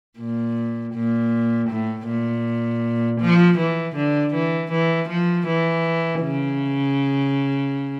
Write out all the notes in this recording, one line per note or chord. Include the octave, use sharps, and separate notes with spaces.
A#2
A#2
A2
A#2
F3
E3
D3
E3
E3
F3
E3
C#3